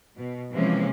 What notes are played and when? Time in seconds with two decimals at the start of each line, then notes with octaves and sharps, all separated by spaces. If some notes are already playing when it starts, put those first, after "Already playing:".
0.18 B2
0.54 C3 E3 F3 G#3 A#3 C#4